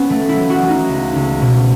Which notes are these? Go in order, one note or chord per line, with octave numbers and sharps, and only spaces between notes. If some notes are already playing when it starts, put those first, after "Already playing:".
Already playing: B3 C#4
F#3 A3
E4
F#3
F#4
F#3
D#4
C#2
C#2
B2